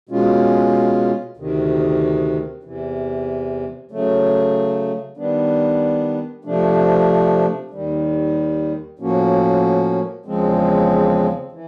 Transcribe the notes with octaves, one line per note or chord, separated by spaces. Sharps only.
B2 G#3 C#4 F4
D2 C3 D#3
E2 C3 E3
C#3 F#3 A3
D#3 G3 B3 D4
C3 F3 A3 D4
D#2 D#3 G3
A2 F3 A#3 C#4 F#4
E2 C#3 F3 G#3 C4
E3